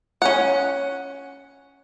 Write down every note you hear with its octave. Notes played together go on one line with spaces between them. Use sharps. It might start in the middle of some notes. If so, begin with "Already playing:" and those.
C#4 F#5